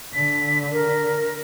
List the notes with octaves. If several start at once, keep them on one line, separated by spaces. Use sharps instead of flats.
D3 B6
A#4